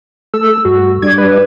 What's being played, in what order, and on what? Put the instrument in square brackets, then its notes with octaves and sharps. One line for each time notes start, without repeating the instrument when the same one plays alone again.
[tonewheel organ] A3 A4 [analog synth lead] E6
[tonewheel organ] G2 [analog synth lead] F#4
[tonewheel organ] G3 D4 D5 [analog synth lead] G#6
[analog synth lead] B4